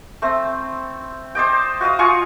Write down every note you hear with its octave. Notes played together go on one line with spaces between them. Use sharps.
A3 C4
C5 D5 D#5 G5
F#4 D#5 F5 D#6
F4 G#5 C6 C#6